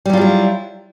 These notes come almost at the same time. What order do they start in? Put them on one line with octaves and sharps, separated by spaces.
G3 F#3 F4 G#4 E4